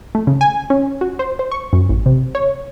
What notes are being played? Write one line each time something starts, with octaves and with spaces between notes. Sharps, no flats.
A3
C#3
G#5
C#4
F#4
C5
C5
C#6
F#2
A1
C3
C#5